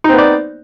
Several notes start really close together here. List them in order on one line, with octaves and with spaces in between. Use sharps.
D#4 C4 B3 D5